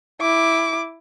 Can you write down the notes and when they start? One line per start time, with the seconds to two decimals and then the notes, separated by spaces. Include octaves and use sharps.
0.21 E4 D6